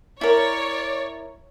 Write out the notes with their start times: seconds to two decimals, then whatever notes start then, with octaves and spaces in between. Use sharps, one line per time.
0.21 E4 A#4 C#5 D5